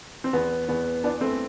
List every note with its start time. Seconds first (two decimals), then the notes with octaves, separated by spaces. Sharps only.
0.24 C4
0.33 E2 B3
0.69 E2 B3
1.04 E3 B3 D4
1.21 A3 C4